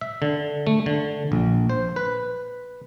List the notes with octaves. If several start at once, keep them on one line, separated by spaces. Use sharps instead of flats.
E5
D3
A3
D3
A#1
C5
B4